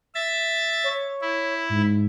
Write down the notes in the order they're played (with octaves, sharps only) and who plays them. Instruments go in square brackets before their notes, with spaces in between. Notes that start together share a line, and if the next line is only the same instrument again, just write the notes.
[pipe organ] E5 A6
[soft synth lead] C#5
[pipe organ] E4
[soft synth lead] G#2